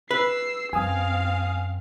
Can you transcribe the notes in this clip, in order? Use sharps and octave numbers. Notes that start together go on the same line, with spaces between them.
B4 E6 C7
F#2 C4 F5 G#5 D#6